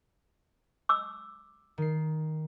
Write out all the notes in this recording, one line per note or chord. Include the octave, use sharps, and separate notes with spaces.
D6 E6
D#3 C7